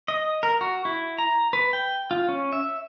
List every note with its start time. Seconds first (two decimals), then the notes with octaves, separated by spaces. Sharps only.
0.08 D#5
0.43 A#4
0.61 F#4
0.85 E4
1.18 A#5
1.53 B4
1.73 G5
2.11 F4
2.29 C#4
2.53 E5